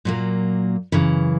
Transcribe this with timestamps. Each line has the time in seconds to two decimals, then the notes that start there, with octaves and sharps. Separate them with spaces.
0.05 A#2 F#3 A#3
0.92 F#2 C#3 E3